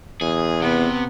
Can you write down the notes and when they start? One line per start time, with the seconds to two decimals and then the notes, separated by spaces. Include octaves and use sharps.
0.21 E2 G#4
0.62 C3 B3